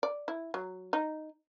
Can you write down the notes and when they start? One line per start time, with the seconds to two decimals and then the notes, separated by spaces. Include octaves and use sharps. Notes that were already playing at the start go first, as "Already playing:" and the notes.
0.03 D5
0.28 E4
0.54 F#3
0.93 D#4